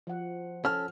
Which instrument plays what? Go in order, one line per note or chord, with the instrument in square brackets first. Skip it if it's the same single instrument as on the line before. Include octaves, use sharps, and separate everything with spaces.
[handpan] F3 F#5
[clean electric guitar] C#4 A4 [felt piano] F6